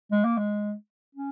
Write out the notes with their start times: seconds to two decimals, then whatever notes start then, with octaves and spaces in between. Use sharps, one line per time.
0.12 G#3
0.24 A#3
0.38 G#3
1.15 C#4